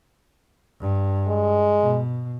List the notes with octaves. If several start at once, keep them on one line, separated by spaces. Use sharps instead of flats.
G2
G#3
B2